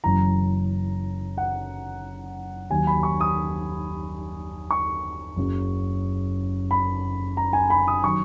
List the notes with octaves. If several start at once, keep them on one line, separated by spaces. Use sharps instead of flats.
F#1 F#2 E3 A#5
F#5
D#2 D#3 F#3 G#5
B5
C#6
D#6
C#6
F#1 F#2 C#3 F#3
B5
A#5
G#5
B5
D#6
D#3 F#3 C#6